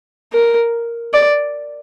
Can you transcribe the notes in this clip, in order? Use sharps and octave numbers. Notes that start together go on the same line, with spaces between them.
A#4
D5